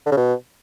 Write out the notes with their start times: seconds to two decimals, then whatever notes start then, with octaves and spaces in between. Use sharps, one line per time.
0.06 D3
0.12 C#3
0.17 B2